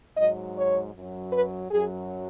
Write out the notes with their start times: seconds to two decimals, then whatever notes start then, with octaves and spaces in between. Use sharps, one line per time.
0.17 G#2 F#3 D#5
0.56 C#5
0.94 F#2 F#3
1.33 B4
1.71 F#2 F#3 G#4